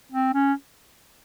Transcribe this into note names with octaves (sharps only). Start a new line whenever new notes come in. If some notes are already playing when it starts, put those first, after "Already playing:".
C4
C#4